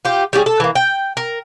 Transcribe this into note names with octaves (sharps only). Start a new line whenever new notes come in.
F4 G4
G3 C#4 G4 G#4
A4
E3 A#3
G5
A#4